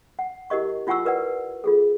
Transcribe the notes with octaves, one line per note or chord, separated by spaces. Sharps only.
F#5
E4 G4 A#4 D#5 C#6
E4 F4 F#5 G#5 C#6 E6
A#4 B4 D5 F#5
F4 G#4 A4